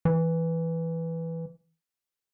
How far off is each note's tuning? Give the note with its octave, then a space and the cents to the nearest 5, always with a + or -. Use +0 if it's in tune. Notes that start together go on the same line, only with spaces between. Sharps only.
E3 +0